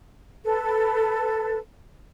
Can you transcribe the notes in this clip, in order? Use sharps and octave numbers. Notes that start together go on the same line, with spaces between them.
A4 B4